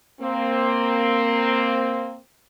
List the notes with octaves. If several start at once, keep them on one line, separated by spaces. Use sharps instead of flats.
A#3 C4